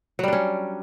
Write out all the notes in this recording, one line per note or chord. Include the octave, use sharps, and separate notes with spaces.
F#3 G3 C#4 D4